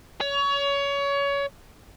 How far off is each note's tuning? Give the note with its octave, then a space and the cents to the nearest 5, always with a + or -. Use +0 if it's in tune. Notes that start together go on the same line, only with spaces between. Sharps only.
C#5 +25